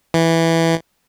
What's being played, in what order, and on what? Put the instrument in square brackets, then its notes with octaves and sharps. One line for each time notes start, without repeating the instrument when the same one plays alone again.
[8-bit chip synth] E3